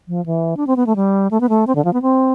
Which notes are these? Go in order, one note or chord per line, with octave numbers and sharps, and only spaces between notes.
F3
E3
D4
C4
B3
A3
G3
A3
B3
A3
C4
D3
F3
B3
C4